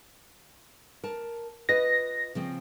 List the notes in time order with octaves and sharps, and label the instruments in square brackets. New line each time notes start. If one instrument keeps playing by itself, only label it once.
[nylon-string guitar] A#4 A5
[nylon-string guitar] F4 B4 D#5 [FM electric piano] A#6
[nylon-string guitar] C#3 F3 C4